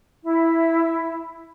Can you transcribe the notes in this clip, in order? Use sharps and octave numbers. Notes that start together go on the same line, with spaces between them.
E4